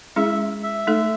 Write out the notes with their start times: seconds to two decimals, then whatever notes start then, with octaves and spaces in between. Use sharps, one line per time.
0.16 G#3 C#4 E4 G#4 E5
0.63 E5
0.87 A3 D#4 A4